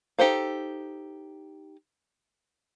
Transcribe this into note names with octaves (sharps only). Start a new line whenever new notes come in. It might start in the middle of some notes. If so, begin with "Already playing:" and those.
D#4 G4 A4 C5 F5